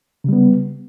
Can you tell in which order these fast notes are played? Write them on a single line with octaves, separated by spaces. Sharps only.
C#3 G3 B3